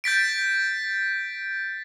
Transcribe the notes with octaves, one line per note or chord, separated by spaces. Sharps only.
G6 A6 B6 D7